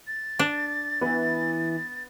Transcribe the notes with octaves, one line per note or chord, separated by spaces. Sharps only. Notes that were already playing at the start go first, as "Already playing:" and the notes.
A6
D4
E3 B3